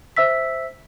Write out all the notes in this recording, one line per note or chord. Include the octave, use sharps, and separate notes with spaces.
C5 E5 E6 B6